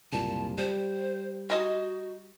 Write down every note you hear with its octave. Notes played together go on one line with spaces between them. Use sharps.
F#1 C2 A#2 A5
G3 C5
D#4 F#4 D#5 G#5